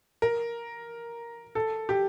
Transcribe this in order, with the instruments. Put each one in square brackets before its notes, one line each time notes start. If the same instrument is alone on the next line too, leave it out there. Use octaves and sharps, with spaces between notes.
[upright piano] A#4
A4
G4